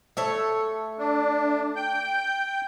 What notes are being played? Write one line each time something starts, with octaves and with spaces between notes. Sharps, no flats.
A3 A4 C#5
D4
G5 G6